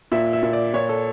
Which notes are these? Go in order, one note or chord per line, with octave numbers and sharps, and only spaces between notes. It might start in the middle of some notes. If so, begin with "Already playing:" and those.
A#2 E5
E5
A#2
D5
A#2 C#5
A4